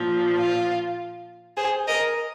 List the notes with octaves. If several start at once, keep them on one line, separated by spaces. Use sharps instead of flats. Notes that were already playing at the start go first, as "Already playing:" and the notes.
Already playing: A#2 F3
F4
G#4 C5
A#4 D#5